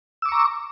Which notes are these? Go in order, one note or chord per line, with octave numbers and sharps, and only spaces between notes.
A#5 C#6 D6 E6